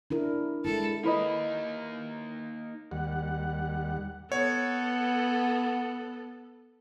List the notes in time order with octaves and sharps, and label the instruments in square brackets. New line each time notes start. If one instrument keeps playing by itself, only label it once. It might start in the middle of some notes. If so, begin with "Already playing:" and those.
[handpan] D4 E4 A#4
[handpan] G#3 E4 [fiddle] A4
[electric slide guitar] A#3 D#4 [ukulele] E4 B4 D#5
[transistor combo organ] D#2 G3 F#5
[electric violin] B3 A4 [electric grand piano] C#5 [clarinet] F#5